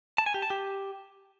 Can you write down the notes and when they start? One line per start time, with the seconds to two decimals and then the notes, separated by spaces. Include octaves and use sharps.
0.18 A5
0.26 G#5
0.34 G4
0.42 A5
0.50 G4